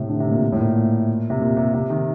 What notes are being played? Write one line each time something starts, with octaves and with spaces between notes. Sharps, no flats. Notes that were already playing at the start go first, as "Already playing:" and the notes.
Already playing: A2 C3
D3
C3
A#2
A2
A#2
C3
A#2
C3
C3
D#3